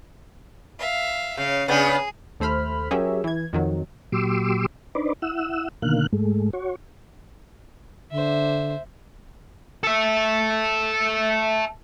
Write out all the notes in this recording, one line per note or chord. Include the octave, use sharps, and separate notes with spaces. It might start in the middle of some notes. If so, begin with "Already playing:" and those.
E5 F5
C#3 F5
C#3 B3 D4 G#4
D#2 A3 C5 B5 F6
F#3 C#4 G4 G#4 A#4 E5
E3 G#6
F2 D#3 F#3
A#2 F#3 G4 C6 D6 E6
D4 D#4 B4 C5 D5
E4 F#5 E6
B2 D3 D#3 A#3 F5 F#6
G#2 G#3 A3
F#4 C#5
D3 C5 E5
A4 E5